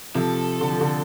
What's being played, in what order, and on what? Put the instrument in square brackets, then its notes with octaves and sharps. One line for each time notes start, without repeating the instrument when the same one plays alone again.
[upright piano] C3 F3 [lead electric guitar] A4
[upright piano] D3
F3
D3